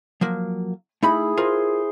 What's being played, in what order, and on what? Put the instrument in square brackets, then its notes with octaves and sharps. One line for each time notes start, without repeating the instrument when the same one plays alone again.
[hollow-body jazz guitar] F3 F#3 A#3
[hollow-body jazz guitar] A3 D#4 B5 [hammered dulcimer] E4 G#4
[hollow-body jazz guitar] F4 G#4 A#4 [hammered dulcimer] C5